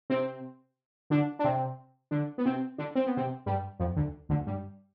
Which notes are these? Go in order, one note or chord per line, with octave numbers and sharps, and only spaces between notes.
C3 C4
D3 D4
D4
C3 C4
D3 D4
B3
C3 C4
D3 D4
C4
B3
C3 C4
G2 G3
F2 F3
D2 D3
D2 D3
G2 G3